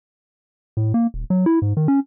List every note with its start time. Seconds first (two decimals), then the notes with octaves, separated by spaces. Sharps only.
0.77 A2
0.94 A#3
1.14 D#1
1.30 F#3
1.46 E4
1.62 G#2
1.77 D#3
1.88 C#4